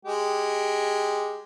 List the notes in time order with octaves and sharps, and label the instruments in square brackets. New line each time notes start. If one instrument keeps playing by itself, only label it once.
[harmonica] G#3 G4